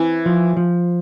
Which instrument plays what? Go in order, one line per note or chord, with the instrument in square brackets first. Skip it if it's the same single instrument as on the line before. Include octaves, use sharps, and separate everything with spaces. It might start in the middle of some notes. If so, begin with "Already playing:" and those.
Already playing: [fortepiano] E3 [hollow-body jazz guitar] C4
[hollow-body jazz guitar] F3
F3